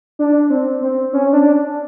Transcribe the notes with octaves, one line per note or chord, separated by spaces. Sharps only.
D4
C4
C4
C#4
D4